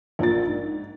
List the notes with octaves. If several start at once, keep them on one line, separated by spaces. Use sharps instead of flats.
A#1 F3 A#3 A6
G#2